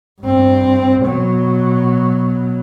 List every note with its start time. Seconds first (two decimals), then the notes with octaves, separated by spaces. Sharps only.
0.22 G2 C4
1.05 B2 F#3